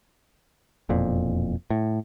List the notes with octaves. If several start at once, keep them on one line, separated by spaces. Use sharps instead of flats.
E1 F2 A#2
A2